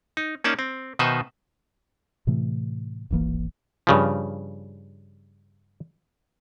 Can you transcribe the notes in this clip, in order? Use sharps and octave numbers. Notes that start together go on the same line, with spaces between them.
D#4
A#3 C#4 D#4 D5 A5
C4
B2 D#3 D#4 B4 C5 E5
A2 C3 E3 A3
D1 G#1 E3 A#3
G2 C#3 F3